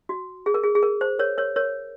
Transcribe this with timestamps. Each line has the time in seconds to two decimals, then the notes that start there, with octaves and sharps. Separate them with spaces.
0.09 F#4
0.46 G#4
0.54 A#4
0.63 G#4
0.75 G#4
0.83 A#4
1.01 C5
1.19 A#4 C#5
1.38 A#4 C#5
1.56 A#4 C#5